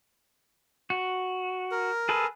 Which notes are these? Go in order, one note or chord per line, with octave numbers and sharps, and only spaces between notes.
F#4
A#4
G#4 A4 B4